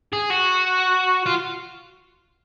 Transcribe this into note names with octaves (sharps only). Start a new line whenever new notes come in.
G#4
F#4
F4